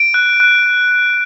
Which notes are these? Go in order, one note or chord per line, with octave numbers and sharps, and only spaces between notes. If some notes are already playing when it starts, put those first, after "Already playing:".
Already playing: D7
F#6
F#6